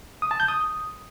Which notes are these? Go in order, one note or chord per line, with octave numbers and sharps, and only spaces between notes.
D#6
A5
G6
D#6